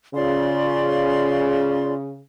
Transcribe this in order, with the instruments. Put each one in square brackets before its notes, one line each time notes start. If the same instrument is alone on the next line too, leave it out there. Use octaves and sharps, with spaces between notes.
[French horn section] C#3 [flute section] F4 D5 C6